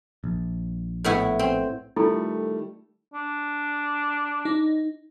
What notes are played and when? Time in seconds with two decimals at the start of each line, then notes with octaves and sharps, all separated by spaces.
0.24 A#1
1.04 A2 B3 E4
1.39 C4
1.96 D#3 G3 A3 E4 F4 A4
3.14 D4
4.45 D#4